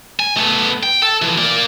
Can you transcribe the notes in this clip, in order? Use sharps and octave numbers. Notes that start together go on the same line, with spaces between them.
G#5
A3 B3
G5
A4
E3 F3
A#3 D5